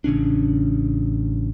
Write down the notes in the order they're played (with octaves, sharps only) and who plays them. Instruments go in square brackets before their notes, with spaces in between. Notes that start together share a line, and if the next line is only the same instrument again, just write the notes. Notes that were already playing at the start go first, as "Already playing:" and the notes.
[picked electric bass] A1 C#3 C#4 D4